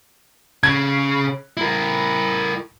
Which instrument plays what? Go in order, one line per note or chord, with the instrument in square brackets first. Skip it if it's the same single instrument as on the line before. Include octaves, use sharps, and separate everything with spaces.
[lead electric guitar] C#3 [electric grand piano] G#6
[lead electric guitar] E4 A#4